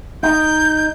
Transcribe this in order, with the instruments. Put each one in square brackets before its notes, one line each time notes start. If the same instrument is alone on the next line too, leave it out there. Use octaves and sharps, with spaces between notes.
[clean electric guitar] D#4 [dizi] G6